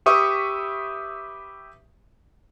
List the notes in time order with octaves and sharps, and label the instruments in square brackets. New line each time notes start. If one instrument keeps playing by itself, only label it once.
[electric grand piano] G4 B4 E5 C#6 D#6